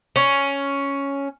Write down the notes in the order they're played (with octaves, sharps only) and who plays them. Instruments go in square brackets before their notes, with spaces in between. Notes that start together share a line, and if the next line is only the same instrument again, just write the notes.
[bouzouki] C#4